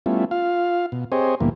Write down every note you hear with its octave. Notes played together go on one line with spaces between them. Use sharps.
G3 A3 B3 C#4 E4 F4
F4 F5
B2
C4 G4 G#4 C5 C#5 D#5
D2 A#2 E3 G3 A#3 B3